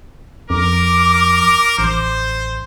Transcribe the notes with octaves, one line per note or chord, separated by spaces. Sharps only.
F2 A#4 D6
A1 C5